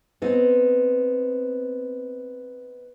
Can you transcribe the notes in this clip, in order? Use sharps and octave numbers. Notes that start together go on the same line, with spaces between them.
B3 C4 D#4